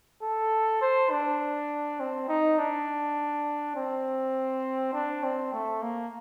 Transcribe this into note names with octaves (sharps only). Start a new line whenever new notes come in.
A4
C5
D4
C4
D#4
D4
C4
D4
C4
A3
A#3